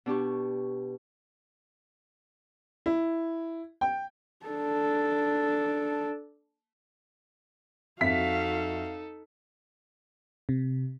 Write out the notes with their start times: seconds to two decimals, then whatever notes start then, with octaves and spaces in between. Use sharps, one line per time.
0.06 B2 D4 G4 C#6
2.86 E4
3.81 G5
4.46 D4 A4
8.01 F2 D#4 F#4 A4 E5 F5 B6
10.49 C3